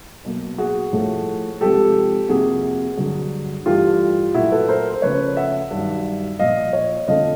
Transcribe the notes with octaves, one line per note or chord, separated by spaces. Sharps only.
B2 F#3 A#3
F#4 G#4
A2 F3 A3
C3 F3 G#3 G4 A4
F2 C3 F3 A#3 F#4 G#4
G2 D3 F#3
G2 E3 A3 F4 G4
A#2 F#3 A3 E4 F#4
A4 B4
A#4 C5
C5
C#3 F3 A3 B4 C#5
E5 F#5
G2 D#3 F#3
A#2 F3 A#3 D#5 F5
C#5 D#5
F2 D3 F3 A3 D#5 F5